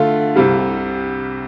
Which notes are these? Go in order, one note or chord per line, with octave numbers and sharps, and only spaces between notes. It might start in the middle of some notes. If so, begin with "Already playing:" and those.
Already playing: D3 A3 F4
C2 C3 G3